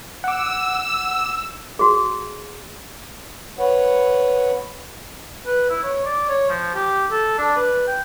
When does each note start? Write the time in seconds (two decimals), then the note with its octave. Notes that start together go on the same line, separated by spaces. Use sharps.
0.24 F#5 D6 E6
1.79 F#4 G#4
3.59 B4 C#5 F#5
5.46 B4
5.70 E4
5.84 C#5
6.05 D5
6.29 C#5
6.50 F3
6.75 G4
7.11 A4
7.38 D4
7.57 B4
7.87 G5